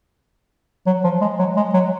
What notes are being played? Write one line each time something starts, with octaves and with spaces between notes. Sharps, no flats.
F#3
F3
G#3
F#3
G#3
F#3